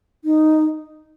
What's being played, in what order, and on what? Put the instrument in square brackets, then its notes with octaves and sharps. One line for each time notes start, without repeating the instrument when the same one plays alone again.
[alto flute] D#4